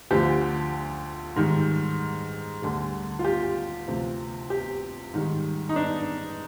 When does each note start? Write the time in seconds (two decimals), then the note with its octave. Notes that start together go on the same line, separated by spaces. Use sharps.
0.11 D2 D3 F3 G4
1.36 G#2 D#3 G3
2.62 D2 D3 G3
3.19 F4
3.24 G4
3.88 D2 C3 F3
4.50 G4
5.14 G#2 D#3 G3
5.69 D#4
5.76 D4